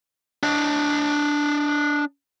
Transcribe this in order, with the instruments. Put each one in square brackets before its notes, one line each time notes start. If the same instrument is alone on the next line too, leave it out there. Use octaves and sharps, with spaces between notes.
[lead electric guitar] D4 D#5